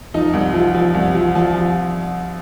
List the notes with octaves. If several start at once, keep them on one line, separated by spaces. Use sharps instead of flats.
F3 D#4
C2
F3
F3
C2
F3
F3
F3